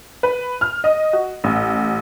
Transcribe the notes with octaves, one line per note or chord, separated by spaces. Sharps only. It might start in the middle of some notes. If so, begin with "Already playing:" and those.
B4
F6
D#5
F#4
A1